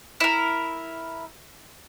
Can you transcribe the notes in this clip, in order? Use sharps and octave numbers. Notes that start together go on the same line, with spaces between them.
E4 A#4